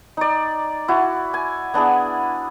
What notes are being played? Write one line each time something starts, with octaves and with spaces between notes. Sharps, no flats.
D#4 D5
E4 F#4
G#5
B3 D4 E4 G#4